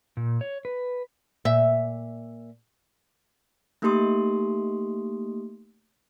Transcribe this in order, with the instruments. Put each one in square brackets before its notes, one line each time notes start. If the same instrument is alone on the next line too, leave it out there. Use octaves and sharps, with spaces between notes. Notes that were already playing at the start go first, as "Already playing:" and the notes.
[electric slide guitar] A#2
C#5
B4
[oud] A#2 E5
[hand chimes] A3 A#3 D#4 G4 C6 D#6